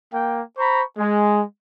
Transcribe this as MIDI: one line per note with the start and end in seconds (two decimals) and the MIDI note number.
0.13 0.41 58
0.13 0.41 79
0.58 0.83 72
0.58 0.83 82
0.58 0.83 83
0.58 0.83 85
0.98 1.42 56